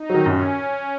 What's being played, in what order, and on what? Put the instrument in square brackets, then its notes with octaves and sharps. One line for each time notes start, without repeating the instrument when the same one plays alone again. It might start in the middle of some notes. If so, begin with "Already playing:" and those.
Already playing: [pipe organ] D#4
[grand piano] D#3 F#3
[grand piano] F#2 [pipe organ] C#4